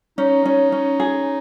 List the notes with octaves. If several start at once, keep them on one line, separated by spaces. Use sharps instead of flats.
C#4 D#4
C#4
C#4
G#4